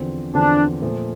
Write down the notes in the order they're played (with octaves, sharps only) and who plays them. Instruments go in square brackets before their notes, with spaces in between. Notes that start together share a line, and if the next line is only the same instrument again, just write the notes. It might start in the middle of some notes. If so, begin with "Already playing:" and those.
Already playing: [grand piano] E2 D3 F3 C4
[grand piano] E2 D3 F3 C4 [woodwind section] D4
[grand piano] A#2 F3 A3